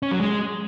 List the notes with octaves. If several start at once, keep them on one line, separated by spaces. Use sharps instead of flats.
C#4
F#3
G#3